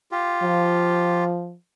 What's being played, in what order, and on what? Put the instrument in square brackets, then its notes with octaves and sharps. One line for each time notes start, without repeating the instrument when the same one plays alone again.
[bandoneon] F4 G4
[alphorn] F3